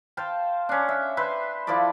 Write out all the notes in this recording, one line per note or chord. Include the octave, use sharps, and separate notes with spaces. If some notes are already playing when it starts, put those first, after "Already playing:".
C5 F5 G5 A5
C#4 D4
E5
B4 C5 E5 C6
F3 E4 A4 D5